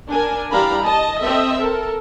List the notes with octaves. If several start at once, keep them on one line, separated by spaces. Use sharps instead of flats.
D4 A#4 G#5
E3 G3 D4 F5 A#5 B5
D#5 A5
C4 A4 D#5 E5
A4 A#4